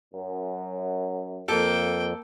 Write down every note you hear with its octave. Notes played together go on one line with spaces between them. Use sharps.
F#2
F2 A#3 A4 G5